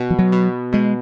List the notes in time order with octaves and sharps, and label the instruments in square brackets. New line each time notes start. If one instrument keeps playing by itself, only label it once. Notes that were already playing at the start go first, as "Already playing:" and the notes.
Already playing: [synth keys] B2
[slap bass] F3
F#3
[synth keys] B2
[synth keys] B2 [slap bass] G#3